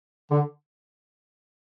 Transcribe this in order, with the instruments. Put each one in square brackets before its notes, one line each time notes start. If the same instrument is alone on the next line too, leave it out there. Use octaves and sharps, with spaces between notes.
[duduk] D3